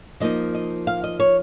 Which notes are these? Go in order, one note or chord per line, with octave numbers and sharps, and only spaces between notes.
F3 A#3 D#4 D#5
D#5
F5
D#5
C#5